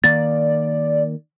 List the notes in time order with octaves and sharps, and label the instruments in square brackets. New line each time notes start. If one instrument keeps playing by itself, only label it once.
[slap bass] D#3 A#3 [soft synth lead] D5 [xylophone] A6